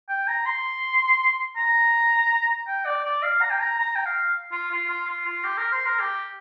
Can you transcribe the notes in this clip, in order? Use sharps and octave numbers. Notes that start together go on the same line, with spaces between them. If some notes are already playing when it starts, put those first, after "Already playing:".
G5
A#5
C6
A#5
G5
D5
D5
F5
A#5
G5
A#5
A#5
G5
F5
F4
F4
F4
F4
F4
G4
A#4
C5
A#4
G4